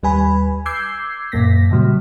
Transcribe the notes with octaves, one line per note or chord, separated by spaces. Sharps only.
D#2 G3 B4 G#5 B5
D6 E6 G6 G#6 C7
F#2 A#2 A#3 A#6 B6
A#2 C#3 F#3 G3